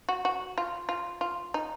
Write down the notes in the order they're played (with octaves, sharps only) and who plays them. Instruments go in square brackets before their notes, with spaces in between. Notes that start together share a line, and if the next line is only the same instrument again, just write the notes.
[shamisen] F#4
F#4
F4
F4
F4
D#4